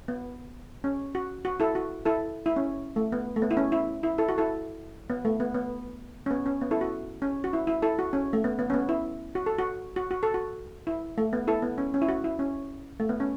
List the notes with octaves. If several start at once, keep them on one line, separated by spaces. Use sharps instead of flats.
B3
C#4
F#4
F#4
E4 A4
F#4
E4 A4
E4
C#4
A3
B3
A3
B3
E4
C#4
E4
E4
E4 A4
F#4
E4 A4
B3
A3
B3
B3
C#4
B3
C#4
B3
E4 A4
F#4
C#4
F#4
E4
E4
E4 A4
F#4
C#4
A3
B3
B3
C#4
B3
E4
F#4
A4
F#4
F#4
F#4
A4
F#4
E4
A3
B3
E4 A4
B3
C#4
C#4
E4
F#4
E4
C#4
A3
B3
C#4